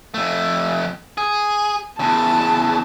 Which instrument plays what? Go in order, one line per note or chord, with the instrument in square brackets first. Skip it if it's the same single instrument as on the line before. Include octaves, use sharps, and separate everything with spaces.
[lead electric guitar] F2 A3
G#4
[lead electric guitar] E2 C#3 [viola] A5